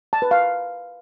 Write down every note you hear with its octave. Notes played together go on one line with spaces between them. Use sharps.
A5
B4
F5